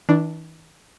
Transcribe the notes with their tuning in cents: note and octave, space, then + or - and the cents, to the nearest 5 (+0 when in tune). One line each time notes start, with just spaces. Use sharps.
E3 -40 D4 +0